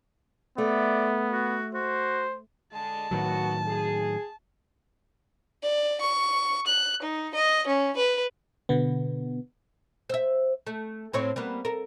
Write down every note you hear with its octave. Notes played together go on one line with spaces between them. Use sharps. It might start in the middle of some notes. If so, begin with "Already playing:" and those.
A3 B3 D5
F#4
F#4 C5
D3 G#3 A5
A2 D#3 F#3 B3 F#4
G#4
D5
C#6
F#6
D#4
D#5
C#4
B4
B2 D3 B3
C5 E5
A3
A2 C4 C#5
G3 A#3 B3
A4 A#4